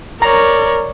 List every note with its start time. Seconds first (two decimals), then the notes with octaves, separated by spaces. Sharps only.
0.22 A#4 C#5 D5 A#5